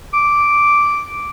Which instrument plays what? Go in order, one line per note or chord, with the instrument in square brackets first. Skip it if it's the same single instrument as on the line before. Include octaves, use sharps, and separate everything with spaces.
[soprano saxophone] D6